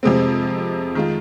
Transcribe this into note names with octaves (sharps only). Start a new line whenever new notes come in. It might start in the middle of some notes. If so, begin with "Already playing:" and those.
F2 C3 G#3 C4
D#3 G#3 F4